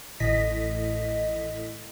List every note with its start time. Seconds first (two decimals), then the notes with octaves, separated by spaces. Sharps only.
0.20 A1 A2 D#5 B6